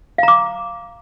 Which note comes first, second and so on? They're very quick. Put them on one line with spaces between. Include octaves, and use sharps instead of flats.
F5 A#5 D6